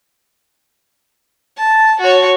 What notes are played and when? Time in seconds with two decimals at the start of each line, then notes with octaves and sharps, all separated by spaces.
1.57 A5
2.00 F#4 C#5